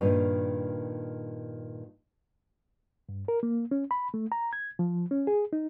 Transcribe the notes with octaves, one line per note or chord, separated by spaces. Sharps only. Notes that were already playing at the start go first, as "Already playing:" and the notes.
G2 A#2 D#3 D#4
G2
A#4
A#3
C#4
B5
A3
A#5
G#6
F3
C#4
G#4
D#4